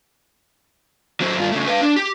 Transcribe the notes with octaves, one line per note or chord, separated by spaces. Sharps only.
F#3 C4
G2 F4
C#3 A3
B4 F5
D4
G4